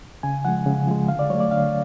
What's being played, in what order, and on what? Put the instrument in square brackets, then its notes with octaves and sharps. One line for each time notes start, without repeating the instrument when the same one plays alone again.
[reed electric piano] C#3 G#5
F3 G#3 F#5
C#3
F3 G#3
D3 F5
D5
F#3 A3 C#5
D5
D3 F5